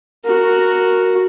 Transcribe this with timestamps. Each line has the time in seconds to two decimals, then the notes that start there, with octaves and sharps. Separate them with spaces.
0.24 F#4 A#4